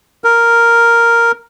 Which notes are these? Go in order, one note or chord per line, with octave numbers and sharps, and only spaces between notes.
A#4